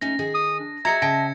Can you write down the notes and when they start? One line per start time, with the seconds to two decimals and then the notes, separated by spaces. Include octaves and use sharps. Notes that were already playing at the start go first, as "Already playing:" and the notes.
0.01 A3 C#4 D#4 A#6
0.19 D#3 G#4 G#5
0.34 D#6
0.60 D4
0.85 F#4 G#4 D#5 E5 A#5 G#6 A#6 C#7
1.02 C#3 D#5 G5 A5